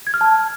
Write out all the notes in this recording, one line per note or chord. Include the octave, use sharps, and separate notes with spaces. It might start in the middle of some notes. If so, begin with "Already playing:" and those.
G#6
F6
A5